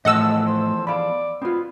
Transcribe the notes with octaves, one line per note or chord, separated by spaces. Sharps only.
E2 A2 F3 A4 D#5 F#5 E6
C5
D5 F5 B5
B3 C4 F4